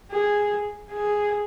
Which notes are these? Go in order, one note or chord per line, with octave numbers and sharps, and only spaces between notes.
G#4
G#4